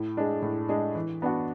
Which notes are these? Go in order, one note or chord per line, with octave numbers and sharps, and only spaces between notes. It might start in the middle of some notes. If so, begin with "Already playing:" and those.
Already playing: A2
G#3 D4 G#4
A2
G#3 D4 G#4
E3
B3 D4 F#4